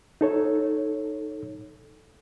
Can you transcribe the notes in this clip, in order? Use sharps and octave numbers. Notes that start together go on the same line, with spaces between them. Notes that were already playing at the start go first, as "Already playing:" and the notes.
D#4 A4 C#5